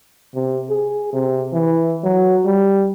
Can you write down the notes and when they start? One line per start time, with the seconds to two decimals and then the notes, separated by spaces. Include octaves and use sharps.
0.35 C3
0.70 G#4
1.13 C3
1.53 E3
2.04 F#3
2.45 G3